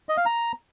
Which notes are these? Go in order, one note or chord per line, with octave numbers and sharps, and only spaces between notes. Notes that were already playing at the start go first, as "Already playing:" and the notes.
D#5
F5
A#5